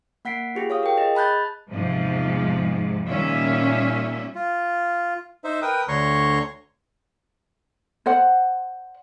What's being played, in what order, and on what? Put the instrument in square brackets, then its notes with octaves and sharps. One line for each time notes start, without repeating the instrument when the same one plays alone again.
[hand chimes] A#3 F#5 B6 C7 D7
F4 G4 G#4
F4 C#5 F5 D#6
A#4 G5
G#4 D#5
A5 B5 F#6 G6 A6
[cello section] E2 G#2 C3 F3 G#3
A#2 D#3 G3 C#4 E5
[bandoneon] F4
D#4 C5 E5
A#4 B4 G5 D#6
D2 D3 C#5 A#5 C6 C#6
[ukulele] C5 D5 F#5